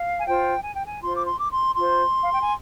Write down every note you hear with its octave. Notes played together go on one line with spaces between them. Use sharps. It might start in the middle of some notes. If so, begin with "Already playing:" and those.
Already playing: F5
G#5
F4 C5 G5
G#5
G5
G#5
F4 C5 C6
D6
C6
D6
C6
F4 C5 C6
F5
G5
G#5